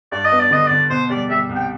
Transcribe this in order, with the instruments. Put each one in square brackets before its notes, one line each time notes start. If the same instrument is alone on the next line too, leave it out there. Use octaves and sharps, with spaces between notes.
[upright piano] G2 [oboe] D5
[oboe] D#5
[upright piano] B3
[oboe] D5
[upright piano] D3 [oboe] D#5
[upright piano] D3 [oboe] D5
[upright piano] B2 [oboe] C5
[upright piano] G3 [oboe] D5
[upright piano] G3 [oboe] E5
[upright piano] C2
[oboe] G5